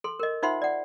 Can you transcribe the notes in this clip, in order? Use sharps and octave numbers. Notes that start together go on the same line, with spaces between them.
A4 C6
A#4 D#5
D#4 F4 C5 E5 F#5 C6
D5 F#5